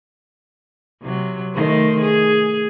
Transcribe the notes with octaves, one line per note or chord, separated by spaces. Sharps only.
C3 F#3
D#3 A3 C5
G#4